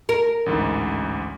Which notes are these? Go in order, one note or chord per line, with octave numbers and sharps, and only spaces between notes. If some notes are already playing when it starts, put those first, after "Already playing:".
A#4
A1 D2 G#2